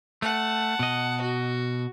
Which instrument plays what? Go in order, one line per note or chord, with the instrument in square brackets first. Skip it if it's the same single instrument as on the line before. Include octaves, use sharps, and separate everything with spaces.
[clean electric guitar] A3 [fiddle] F#5 A5
[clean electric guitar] B2 D#5
[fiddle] F#4